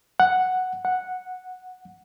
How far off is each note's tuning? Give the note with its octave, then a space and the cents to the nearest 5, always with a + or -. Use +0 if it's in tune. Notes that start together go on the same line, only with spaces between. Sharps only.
F#5 +0
F#5 -5